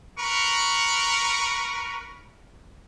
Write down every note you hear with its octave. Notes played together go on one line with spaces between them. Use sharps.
A#4 B4 C#6